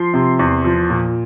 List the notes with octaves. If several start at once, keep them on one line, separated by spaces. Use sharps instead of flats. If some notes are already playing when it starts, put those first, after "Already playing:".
Already playing: F3 C6
C3
E2
F3
A#2